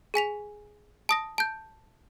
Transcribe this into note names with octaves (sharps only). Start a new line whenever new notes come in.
G#4 G#5 B6 F7
A5 D#6 A#6
A5 G6